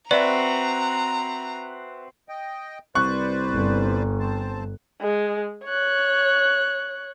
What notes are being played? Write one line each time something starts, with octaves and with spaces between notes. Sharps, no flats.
C4 F#4 B4 D5 E5 A#5
D#5 G5
C2 B4 C5 D5 C#6 F#6
G1
C4 C5 A5
G#3
C#5 F#6